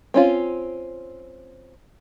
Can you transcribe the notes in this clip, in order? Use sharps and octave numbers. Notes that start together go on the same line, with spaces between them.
C4 C#4 F4